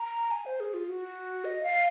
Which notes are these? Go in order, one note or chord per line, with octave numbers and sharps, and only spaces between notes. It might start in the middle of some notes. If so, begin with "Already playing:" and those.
Already playing: A#5
G#5
C5
G#4
F4
F#4
D#5
F5